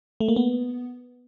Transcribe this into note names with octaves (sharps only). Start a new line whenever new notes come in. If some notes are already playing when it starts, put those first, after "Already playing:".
A3
A#3
B3